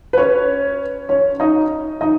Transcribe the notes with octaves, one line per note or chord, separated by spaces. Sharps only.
B4
C#4 C#5
C#4 C#5
D#4 D#5
D#4 D#5